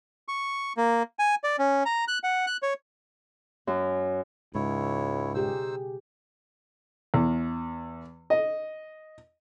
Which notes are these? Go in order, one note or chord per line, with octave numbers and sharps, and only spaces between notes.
C#6
A#3
G#5
D5
C#4
A#5
F#6
F#5
F#6
C#5
F#2
C#2 G#2 C#3 E4 C#5
B2 D#4 G4 G#4 C5 E6
E2
D#5